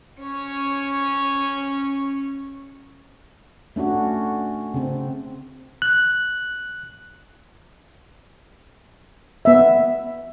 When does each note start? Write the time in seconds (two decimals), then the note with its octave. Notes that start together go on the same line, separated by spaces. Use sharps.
0.23 C#4 C#5
3.76 A3 C#4 D4 F#4
4.74 C#3 C4
5.82 F#6
9.45 B3 E5